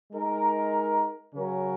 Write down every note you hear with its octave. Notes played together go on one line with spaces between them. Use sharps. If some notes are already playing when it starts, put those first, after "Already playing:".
G#3 D#4 A#4
C#3 F#3 C#4 F#4 A#4